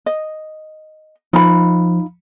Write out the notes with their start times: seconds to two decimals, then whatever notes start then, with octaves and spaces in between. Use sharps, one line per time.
0.06 D#5
1.33 F3 D#4 F4 B5